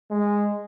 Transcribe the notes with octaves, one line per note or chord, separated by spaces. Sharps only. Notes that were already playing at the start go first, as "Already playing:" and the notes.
G#3